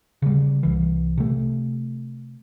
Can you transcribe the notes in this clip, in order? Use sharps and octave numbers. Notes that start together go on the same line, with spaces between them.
C#3 G3
C2 E3
C3 A3